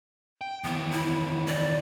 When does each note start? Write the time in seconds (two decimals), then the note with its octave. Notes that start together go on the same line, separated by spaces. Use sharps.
0.41 G5
0.64 D#2 E3 B3
0.91 E4
1.47 D5